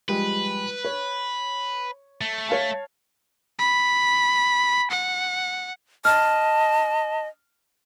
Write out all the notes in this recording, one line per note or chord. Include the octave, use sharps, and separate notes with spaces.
F3 G3 G#3 B4
C#5
A3
C#5 F5 A5
B5
F#5
D#5 A5 F6